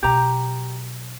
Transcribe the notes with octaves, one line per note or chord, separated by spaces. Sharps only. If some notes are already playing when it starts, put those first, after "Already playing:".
B2 F#3 G4 A#5